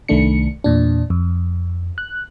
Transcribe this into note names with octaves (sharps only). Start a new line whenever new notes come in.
C2 D#3 A3 D4 C#7
E2 A#2 D4
F2
F#6